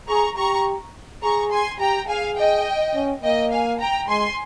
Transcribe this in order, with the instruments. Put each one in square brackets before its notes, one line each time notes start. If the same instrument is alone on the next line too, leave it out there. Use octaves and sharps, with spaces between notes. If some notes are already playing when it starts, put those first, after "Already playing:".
[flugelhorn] G#4 [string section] A#5 C#6
[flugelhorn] G4 [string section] A#5 C#6
[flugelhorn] G#4 [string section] A#5 C#6
[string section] G#5 C6
[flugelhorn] G4 [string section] G5 A#5
[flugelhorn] G#4 [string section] F5 G#5
[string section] D#5 G5
[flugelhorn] C#4
[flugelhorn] A#3 [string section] D#5 G5
[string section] F5 G#5
G5 A#5
[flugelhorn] G#3 [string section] G#5 C6